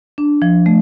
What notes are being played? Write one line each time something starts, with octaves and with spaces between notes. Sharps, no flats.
D4
F3
A3